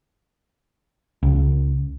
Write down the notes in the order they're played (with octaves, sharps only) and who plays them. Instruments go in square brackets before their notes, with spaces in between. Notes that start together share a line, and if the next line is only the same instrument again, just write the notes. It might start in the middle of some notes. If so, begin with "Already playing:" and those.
[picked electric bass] C#2